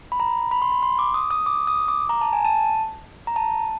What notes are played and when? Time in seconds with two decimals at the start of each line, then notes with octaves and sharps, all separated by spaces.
0.12 B5
0.20 A#5
0.51 B5
0.62 C6
0.72 B5
0.83 C6
0.99 D6
1.14 D#6
1.31 D#6
1.46 D6
1.67 D#6
1.88 D6
2.09 A#5
2.21 A5
2.33 G#5
2.45 A5
3.27 A#5
3.36 A5